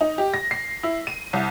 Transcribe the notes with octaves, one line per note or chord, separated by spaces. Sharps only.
D#4
G4
A#6
C7
E4
D#7
C2